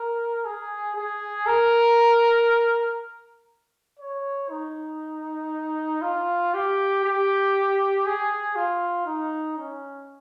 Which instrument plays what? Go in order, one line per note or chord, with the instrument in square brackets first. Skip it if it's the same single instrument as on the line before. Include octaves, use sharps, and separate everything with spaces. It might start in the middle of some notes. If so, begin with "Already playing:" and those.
Already playing: [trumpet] A#4
G#4
G#4
A#4
C#5
D#4
F4
G4
G4
G#4
F4
D#4
C#4